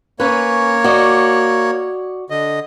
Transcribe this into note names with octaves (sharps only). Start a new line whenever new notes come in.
A#3 C#4 B4 C#5
F#4 D5 D#5
D3 D#5